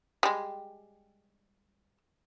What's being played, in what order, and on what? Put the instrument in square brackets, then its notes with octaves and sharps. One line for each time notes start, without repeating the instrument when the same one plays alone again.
[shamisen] G3 G#3